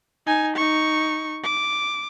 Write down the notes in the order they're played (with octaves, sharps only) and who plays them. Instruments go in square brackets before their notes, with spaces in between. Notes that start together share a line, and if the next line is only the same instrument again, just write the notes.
[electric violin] D#4 G#5
D#4 C#6
D6